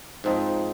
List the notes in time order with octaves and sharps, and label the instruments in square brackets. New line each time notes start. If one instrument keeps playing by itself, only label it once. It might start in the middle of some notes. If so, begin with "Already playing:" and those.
[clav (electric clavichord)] G#2 F3 C4 D#4